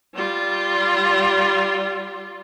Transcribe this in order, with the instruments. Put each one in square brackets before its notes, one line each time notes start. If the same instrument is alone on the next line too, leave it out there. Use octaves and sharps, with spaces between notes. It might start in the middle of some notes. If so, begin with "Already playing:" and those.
[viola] G3 F4